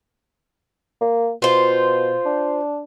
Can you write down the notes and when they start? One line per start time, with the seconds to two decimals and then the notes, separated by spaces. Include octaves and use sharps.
1.01 A#3
1.42 B2 F4 C5
2.26 D4